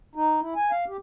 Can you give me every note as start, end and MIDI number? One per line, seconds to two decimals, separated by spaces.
0.15 0.40 63
0.41 0.54 64
0.56 0.71 80
0.71 0.85 77
0.88 0.97 67